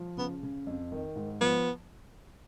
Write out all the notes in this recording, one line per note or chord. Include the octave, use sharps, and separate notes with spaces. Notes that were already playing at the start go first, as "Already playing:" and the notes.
Already playing: F3
C#3 B3
C#3
F2
D#3
G#2
F3 B3